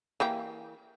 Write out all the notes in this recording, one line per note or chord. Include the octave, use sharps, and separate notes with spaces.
E3 A#3 G4